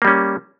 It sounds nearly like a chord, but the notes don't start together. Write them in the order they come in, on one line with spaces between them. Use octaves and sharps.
A#3 G3 C#4